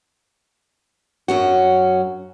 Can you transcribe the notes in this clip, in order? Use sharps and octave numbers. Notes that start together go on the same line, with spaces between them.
F#2 C#4 F#4